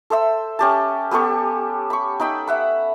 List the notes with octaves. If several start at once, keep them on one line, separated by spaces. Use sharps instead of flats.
A4 C5 E5 E6
C#4 G4 A5
B3 G4 A4 C#6
B5 C#6
D#4 G5 B5 E6
E5 F#5 B5